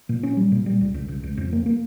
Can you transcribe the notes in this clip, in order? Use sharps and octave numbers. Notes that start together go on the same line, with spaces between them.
A#2
C#4
G3
A#2
G3
C#2
C#2
C#2
C#2
F2
A#3
A#3